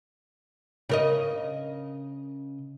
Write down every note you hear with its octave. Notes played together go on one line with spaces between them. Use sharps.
C#3 A#4 D#5